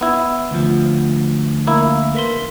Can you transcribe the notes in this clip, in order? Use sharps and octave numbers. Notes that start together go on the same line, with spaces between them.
B3 E4
D2 F3
A#3 E4
A#4 B4 C6